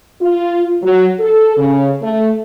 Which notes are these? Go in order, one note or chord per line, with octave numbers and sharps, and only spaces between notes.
F4
F#3
A4
C#3
A3